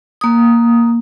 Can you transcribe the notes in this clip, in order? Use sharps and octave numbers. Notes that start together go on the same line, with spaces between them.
A#3 D#6